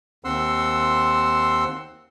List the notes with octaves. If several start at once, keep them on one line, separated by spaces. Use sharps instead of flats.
D#2 C4 F#5 C6 E6